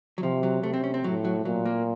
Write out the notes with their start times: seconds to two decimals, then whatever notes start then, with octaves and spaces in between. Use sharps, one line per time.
0.18 F#3
0.23 C3 F3
0.43 F#3
0.63 C3 A3
0.74 C4
0.84 C#4
0.94 C4
1.04 A2 F#3
1.25 F#3
1.45 A#2 F#3
1.66 A#3